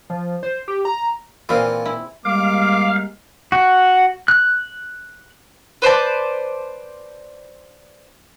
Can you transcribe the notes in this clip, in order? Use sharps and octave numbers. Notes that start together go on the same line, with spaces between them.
F3
C5
G4
A#5
A#2 E3 C4 F4 G#4
E4
G3 G#3 A#3 F5 D6
F#4
F#6
B4 C5 D5 A5